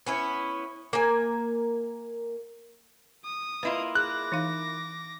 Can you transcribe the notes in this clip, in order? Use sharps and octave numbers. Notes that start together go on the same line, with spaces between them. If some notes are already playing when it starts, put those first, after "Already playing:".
B3 C#4 E4
A#3 G#5
D#6
A#3 E4 F4 B4 D#5
G#4 D6 F#6 A#6
E3 D#4 F5